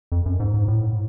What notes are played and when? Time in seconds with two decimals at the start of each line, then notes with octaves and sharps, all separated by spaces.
0.12 F2
0.26 F#2
0.40 G#2
0.54 G#2
0.68 A2